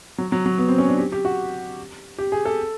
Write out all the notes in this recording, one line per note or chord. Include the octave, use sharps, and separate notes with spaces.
F#3
F#3
F#3
B3
C4
C#4
D4
G4
G4
F#4
G4
G#4
A4